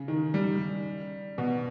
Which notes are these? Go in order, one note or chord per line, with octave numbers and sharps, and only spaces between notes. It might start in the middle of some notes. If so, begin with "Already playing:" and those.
Already playing: C#3
D#3
G3
B2